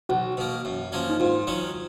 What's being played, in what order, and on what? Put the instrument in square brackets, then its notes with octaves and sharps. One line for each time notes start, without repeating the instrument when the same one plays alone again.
[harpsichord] B1 [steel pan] F#4
[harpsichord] B2 A#3
F#2
F3 A#3 C#4
[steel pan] D#4
[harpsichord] G#2 [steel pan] F4
[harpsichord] D#3 F#3 C#4